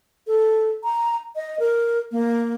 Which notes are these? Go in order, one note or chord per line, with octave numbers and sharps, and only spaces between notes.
A4
A#5
D#5
A#4
A#3